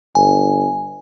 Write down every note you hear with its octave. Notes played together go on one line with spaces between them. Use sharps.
G1 G#5